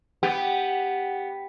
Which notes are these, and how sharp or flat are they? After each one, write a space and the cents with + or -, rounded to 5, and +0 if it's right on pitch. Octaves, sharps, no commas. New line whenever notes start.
B3 +0 G4 +0